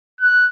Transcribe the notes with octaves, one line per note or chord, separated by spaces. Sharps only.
F#6